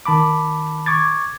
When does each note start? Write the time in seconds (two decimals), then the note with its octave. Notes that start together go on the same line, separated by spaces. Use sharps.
0.06 D#3 A5 B5 D6
0.86 C#6 D6 G#6 A6